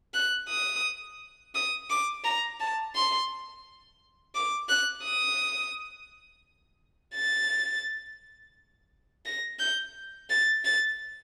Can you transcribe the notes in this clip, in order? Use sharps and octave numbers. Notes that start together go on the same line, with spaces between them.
F#6
D#6
D#6
D6
A#5
A5
C6
D6
F#6
D#6
A6
A#6
G6
A6
A6